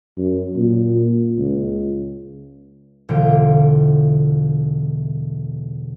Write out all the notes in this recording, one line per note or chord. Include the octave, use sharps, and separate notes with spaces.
F#2
A#2
C#2
E1 B2 D3 G3 F4 D7